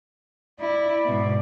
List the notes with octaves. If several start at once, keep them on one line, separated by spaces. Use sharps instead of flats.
E4 D5
G#2 B2